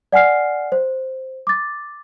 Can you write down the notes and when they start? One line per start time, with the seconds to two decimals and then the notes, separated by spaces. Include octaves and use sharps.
0.12 D5 F#5 G#5 F6 C7
0.72 C5
1.47 D6 A6